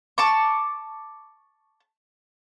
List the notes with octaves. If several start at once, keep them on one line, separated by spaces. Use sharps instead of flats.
A5 C#6 D6